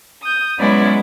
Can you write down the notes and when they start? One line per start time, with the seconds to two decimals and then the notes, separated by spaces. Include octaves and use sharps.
0.22 D#6 G6
0.58 F#3 G#3 B3 C#4 E4 D5